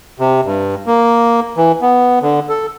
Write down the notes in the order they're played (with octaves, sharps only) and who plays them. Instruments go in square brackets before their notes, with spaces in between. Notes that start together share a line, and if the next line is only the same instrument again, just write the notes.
[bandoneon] C3
G2
A#3
E3
B3
D3
A4